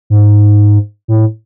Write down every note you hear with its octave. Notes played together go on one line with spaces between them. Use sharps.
G#2
A2